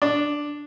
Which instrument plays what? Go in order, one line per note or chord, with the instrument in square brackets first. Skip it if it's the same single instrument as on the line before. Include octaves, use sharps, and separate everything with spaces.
[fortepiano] D4